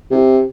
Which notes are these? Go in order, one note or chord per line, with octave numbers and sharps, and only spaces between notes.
C3